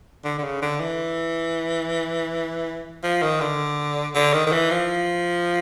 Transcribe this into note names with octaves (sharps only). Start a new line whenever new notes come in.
D3
D3
C#3
D3
E3
F3
D#3
D3
D3
D#3
D#3
E3
F3